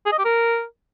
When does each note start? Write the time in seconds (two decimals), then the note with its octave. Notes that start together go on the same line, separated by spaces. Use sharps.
0.06 G#4
0.12 D#5
0.18 G4
0.25 A#4